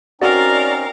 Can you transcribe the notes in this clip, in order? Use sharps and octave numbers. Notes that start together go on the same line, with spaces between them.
C4 C#4 D#4 F#4 A#4 D5 F5